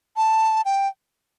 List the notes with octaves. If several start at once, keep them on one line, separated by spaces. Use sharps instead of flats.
A5
G5